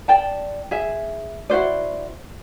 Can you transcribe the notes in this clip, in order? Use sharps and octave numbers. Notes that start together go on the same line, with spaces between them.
D5 G5 A5
G#4 E5
E4 F#4 C5 D5